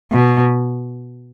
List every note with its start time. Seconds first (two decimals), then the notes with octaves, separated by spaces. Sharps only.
0.12 B2